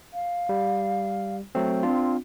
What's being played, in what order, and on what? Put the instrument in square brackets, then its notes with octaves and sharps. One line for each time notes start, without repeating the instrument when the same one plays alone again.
[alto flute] F5
[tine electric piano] G3
F#3 A3 C4
[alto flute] C4 [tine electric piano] D4 F4